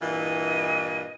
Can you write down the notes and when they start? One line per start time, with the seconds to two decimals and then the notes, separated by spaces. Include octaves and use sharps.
0.01 G2 A#2 E3 D#5